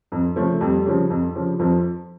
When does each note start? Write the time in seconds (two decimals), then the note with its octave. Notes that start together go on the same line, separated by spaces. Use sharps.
0.12 F2
0.36 C#3 F3 A3
0.61 F2 G3
0.86 C#3 F3
1.10 F2
1.35 C#3 F3
1.59 F2 F3